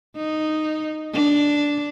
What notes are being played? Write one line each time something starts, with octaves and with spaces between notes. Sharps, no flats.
D#4
D4